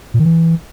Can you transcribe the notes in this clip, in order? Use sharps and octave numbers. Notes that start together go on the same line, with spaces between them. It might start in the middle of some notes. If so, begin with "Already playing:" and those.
A#2
D#3
E3